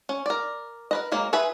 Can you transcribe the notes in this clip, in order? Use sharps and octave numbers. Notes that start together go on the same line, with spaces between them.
C#4
A#4 D5
A#4 B4 D#5
F#3 G#3 A#3
F4 G#4 B4 E5 B5